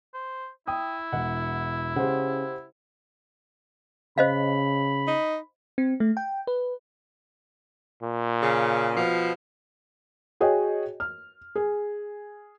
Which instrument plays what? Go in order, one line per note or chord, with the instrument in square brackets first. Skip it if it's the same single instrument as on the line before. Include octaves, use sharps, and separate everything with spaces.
[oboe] C5
[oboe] E4 [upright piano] G5 D#6
[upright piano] E1 [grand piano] F#5
[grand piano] C#3 [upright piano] G4 C5 F#5
[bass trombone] C#3 [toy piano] C5 D#5 F5 [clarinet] B5
[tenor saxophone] D#4
[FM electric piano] C4
A3
G5
B4
[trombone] A#2
[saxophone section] C#3
B2 F3
[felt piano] F#4 G#4 C#5 D#5 G5
F6
G#4